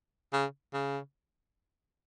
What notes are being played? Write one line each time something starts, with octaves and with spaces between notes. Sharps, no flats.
C#3
C#3